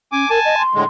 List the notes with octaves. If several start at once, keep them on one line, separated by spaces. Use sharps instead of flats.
C#4 G#5 D6
A#4 G#5 A5
D#5
C6
A2 D3 G#3